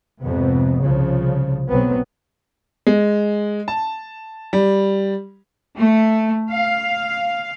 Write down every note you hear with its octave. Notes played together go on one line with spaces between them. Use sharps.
F2 G#2 C3 B3
C2 C#3 F3
B1 F#3 B3 C4
G#3
A5
G3
A3
F5